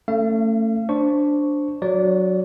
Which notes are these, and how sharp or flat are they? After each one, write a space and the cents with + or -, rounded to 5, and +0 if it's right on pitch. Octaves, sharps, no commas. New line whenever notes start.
A3 +25 C#4 +0 F5 -40
D4 -5 C5 +0 C#6 +0
F#3 +0 D5 -20